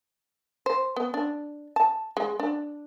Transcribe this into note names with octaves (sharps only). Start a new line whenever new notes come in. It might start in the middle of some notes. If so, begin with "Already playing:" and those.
C5
B3
D4
A5
G#3
D4